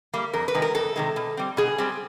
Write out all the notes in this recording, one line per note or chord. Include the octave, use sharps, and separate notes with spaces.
G3 A#3
F2 A#4
B4
C3 D#3 G#3
A#4
F2 A4
C3 D#3 G#3
B2
G3 C4
B2 G#4
G3 C4